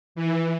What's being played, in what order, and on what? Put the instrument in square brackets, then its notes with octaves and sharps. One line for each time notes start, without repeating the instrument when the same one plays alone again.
[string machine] E3